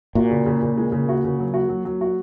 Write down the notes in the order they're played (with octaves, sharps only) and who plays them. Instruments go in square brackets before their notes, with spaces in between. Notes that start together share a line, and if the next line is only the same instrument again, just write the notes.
[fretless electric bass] A#2 [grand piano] F#4
[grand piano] C#3
C#3
C#3
G#3
C#3
F#4
C#3
F#3
F#4
F#3
F#3
F#4